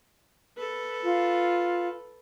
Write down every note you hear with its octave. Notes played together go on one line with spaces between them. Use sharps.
A4 B4
F4